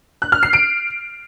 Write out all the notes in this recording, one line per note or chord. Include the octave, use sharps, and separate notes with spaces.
F#6
F6
C7
D7